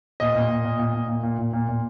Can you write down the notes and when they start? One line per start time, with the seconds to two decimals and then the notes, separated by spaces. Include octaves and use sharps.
0.20 A#2 D#5
0.35 A#2
0.50 A#2
0.65 A#2
0.79 A#2
0.94 A#2
1.09 A#2
1.23 A#2
1.38 A#2
1.53 A#2
1.68 A#2